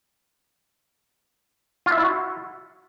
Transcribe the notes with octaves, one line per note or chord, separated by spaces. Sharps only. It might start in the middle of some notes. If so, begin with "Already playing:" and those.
F4
E5
E4
F#4